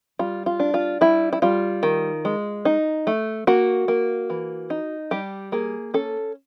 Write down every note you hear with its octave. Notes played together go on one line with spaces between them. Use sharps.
G3 F4
F4
D4
F4
G3 E4
E4
G3 F4
D#3
G#3
D#4
A3
A#3 F#4
A#3
E3
D#4
G3 G4
A#3 G#4
C#4 A4